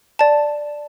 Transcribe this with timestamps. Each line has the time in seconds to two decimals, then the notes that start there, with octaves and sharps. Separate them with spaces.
0.19 D5 A5